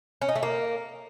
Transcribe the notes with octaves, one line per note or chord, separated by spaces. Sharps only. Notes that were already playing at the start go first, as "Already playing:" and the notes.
C#4
D#4
A3
A#3